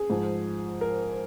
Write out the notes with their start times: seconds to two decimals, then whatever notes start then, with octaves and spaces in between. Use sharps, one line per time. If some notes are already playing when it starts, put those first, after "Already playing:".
Already playing: G#4
0.10 G#2 F3
0.81 A#4